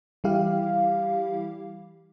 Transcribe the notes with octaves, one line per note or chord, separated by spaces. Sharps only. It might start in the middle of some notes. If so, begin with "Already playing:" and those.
E3 G3 E4 G4 F5